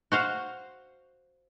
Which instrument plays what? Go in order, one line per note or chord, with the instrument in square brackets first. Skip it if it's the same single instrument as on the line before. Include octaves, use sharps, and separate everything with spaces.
[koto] F#4 C5 F5